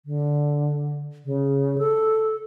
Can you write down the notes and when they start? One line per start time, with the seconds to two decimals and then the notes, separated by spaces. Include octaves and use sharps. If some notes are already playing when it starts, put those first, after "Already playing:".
0.06 D3
1.25 C#3
1.78 A4